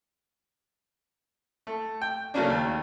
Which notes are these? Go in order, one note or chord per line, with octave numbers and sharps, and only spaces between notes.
A3
G5
C#3 F#3 A3 A#3 C#4 D4
D#2